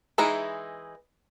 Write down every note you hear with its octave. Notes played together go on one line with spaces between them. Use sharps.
E3 G#3 D#4 E4 G#4